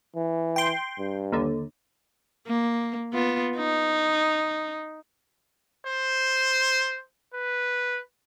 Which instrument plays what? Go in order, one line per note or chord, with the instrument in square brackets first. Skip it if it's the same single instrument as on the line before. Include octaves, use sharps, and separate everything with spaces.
[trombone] E3
[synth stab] G5 C6
[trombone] G2
[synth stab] D#2 D3
[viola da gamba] A#3
B3 F4
D#4
[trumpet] C5
B4